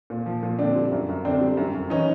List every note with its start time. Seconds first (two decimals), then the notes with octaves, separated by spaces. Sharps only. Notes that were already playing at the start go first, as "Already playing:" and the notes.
0.10 A#2
0.26 F3
0.43 A#2
0.59 D3 C4 D4
0.76 G3
0.92 F#2
1.09 F#2
1.25 D3 C4 D4
1.41 G3
1.57 F#2
1.74 F#2
1.90 E3 C#4 D#4